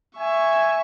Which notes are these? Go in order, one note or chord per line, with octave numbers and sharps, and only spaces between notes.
E5 G#5 C#6